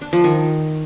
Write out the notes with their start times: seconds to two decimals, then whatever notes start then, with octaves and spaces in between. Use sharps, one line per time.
0.01 D4
0.13 F3
0.24 D#3